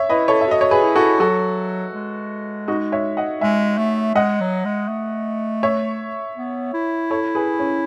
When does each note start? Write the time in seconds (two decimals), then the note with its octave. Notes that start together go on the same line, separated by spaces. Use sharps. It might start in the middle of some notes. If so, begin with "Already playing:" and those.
Already playing: C#5 E5
0.10 E4 B4 D#5
0.28 A4 C#5
0.41 E5
0.47 F#4 D#5
0.61 C#5
0.71 G#4 B4
0.83 E4
0.96 F#4 A4
1.20 F#3 F#4 A4
1.94 G#3
2.68 D#4 F#4
2.92 C#5 E5
3.17 D#5 F#5
3.41 G#3 E5 G#5
3.78 A3
4.15 G#3 D#5 F#5
4.41 F#3
4.65 G#3
4.89 A3
5.63 C#5 E5
6.37 B3
6.74 E4
7.10 A4 C#5
7.35 G#4 B4
7.59 C#4